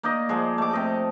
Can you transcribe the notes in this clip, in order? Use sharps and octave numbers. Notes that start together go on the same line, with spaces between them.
A#3 D#4 D5 D#5
F3 G#3
A3 D6
C3 D#5 D6